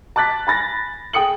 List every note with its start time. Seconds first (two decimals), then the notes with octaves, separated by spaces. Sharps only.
0.16 A5 D6 F#6 A6 B6
0.47 G#5 B5 A6 A#6
1.13 G#4 G5 D#6 C#7 F#7